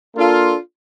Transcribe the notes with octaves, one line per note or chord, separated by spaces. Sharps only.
A#3 D4 F4 A4